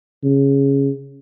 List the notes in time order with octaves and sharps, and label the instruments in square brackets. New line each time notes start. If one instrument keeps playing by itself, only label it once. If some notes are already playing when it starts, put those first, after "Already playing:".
[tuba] C#3